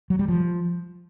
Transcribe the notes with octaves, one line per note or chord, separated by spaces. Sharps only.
F#3
G3
F3